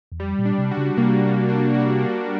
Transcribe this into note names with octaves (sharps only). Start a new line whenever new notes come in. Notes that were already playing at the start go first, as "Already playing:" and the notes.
E2
F2 G3
A#2
D4
C3
F#4
C#3
C3 A#3
G3
D4
F#4
A#3